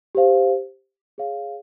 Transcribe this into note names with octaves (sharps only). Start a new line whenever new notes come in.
G4 C5 F5
G#4 C#5 F5